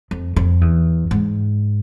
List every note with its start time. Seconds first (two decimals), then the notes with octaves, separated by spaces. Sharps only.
0.11 F2
0.36 F2
0.61 E2
1.11 G#2